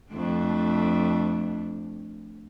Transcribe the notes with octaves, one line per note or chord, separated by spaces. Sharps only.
F2 A3 D4